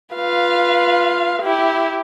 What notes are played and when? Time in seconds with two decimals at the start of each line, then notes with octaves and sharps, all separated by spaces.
0.15 F4 B4 F5
1.42 E4 G4